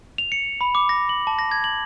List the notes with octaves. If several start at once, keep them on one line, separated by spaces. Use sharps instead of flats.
F7
C#7
B5
D6
A#6
F#7
A5
A#6
G#6
F#7